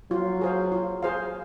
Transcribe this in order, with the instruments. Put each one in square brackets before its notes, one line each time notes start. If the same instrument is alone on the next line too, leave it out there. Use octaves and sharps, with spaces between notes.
[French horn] F#3 [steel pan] F4
[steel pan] G#4 C5 F5
F4
G#4 C5 F5